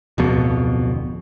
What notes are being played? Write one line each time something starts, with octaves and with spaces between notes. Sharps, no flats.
D1 F2 B2